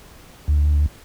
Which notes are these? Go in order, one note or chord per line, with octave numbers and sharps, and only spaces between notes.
D2